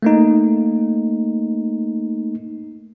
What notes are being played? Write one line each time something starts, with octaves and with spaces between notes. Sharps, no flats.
A3 A#3 D#4